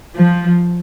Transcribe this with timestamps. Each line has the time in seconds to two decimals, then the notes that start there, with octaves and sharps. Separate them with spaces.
0.15 F3